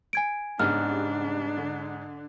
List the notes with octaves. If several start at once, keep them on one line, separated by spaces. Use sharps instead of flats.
G#5 G#6 D7
G#2 C#3 G3 B3 D4 F6
D3